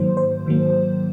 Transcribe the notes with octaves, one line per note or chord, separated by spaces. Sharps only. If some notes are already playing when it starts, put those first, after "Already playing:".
Already playing: G#2 D#3 F#3 A#3 C5
C5
G#2 D#3 F#3 A#3